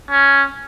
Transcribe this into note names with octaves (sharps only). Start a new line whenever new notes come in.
C#4